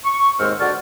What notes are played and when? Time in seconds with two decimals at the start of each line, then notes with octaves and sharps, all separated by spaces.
0.05 C#6
0.39 D#2 G#2 G#3 C4 E6 F6
0.60 D3 F#4 D5 A5 F6